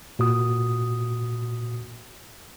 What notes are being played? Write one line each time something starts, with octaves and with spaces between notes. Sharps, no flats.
A#2 F#4 D#6